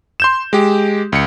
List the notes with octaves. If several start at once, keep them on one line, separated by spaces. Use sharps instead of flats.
C6 G6 E7
G#3 G4
C#2 C#7